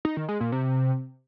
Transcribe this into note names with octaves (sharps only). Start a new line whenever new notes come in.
D#4
D#3
G#3
A#2
C3